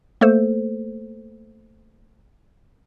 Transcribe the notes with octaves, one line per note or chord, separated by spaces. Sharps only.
A3 A#3 A4 C5